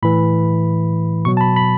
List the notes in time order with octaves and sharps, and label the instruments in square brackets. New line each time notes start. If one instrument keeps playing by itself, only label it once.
[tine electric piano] A2 E3 B5
B2 F#3 C#6
A5
B5
B5